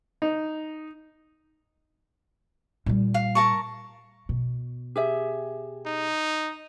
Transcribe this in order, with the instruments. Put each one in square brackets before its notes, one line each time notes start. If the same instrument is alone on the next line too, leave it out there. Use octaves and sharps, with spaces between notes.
[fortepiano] D#4
[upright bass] A#2 G3
[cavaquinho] F5
A#4 A5 C#6
[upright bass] B2
[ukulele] G4 G#4 E5
[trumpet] D#4